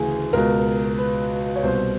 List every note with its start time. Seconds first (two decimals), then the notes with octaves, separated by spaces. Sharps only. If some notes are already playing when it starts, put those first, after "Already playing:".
Already playing: D2 C#3 E3 G#4
0.33 C#2 B2 A#4
0.98 B4
1.56 C#5
1.63 C2 B2 C5